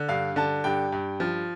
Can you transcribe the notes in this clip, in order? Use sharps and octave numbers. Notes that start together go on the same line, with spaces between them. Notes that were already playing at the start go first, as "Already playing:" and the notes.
Already playing: D3
G2 F5
D3 A5
G2 G5
G2
F3